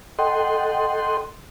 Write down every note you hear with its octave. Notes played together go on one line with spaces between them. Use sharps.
A4 D#5 F#5 G5 C6